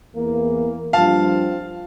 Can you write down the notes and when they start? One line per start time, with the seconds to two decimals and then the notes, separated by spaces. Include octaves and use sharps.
0.14 E2 E3 A#3
0.93 G2 F3 C4 F4 F5 A5